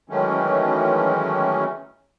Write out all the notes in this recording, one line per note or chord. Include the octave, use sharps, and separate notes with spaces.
D#3 E3 F#3 G#3 A3 C#4